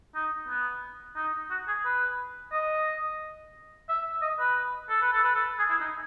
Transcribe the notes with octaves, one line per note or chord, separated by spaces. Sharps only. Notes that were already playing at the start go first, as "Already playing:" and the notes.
D#4
B3
D#4
F#4
G#4
B4
D#5
E5
D#5
B4
A4
B4
A4
B4
A4
G#4
E4
D#4